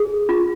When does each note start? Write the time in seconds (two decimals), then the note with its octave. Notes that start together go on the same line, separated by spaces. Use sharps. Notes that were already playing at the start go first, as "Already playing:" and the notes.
Already playing: G#4
0.29 F4